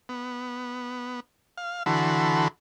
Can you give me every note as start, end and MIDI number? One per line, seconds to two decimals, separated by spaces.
0.09 1.20 59
1.58 1.83 77
1.86 2.48 50
1.86 2.48 52
1.86 2.48 66
1.86 2.48 69
1.86 2.48 83
1.86 2.48 84